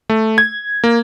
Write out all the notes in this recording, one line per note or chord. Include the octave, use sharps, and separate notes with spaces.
A3
G#6
A#3